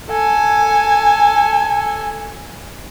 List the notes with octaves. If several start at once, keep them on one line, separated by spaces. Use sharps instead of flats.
A4 G#5